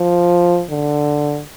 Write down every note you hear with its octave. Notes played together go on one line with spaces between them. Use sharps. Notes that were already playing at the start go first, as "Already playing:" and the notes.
Already playing: F3
D3